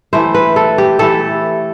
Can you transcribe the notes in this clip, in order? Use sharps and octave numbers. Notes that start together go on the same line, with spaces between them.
E3 A3 E4 C5
B4
A4
G4
E3 A3 E4 A4